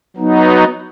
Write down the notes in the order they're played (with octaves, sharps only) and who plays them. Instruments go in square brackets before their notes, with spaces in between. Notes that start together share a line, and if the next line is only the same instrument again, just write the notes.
[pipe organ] F#3 B3 D#4